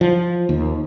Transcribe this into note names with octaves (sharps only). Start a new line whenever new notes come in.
F3
D#2